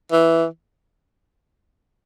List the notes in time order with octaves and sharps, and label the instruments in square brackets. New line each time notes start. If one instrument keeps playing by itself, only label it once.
[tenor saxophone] E3